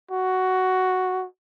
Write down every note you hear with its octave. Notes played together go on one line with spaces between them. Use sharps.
F#4